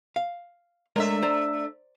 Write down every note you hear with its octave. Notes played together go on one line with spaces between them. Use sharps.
F5
G#3 A3 D4 A#4 C#5 E5
C5 D5 A#5